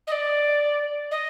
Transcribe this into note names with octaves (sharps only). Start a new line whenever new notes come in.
D#5
D5
D#5